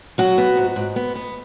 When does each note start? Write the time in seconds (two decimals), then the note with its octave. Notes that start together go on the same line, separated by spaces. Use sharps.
0.18 F#3 F#4
0.38 B3
0.57 G#2
0.76 G#2
0.96 B3
1.15 B3